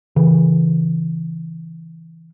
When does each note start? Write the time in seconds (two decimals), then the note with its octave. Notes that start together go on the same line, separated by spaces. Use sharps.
0.16 C#3 E3